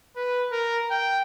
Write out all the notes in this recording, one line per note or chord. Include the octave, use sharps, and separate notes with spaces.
B4
A#4
G5